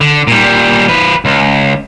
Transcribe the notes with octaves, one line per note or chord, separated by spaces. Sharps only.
D3
A#2 G3
F3 B4
C#2